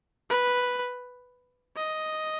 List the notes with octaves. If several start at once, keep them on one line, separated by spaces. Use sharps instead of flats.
B4
D#5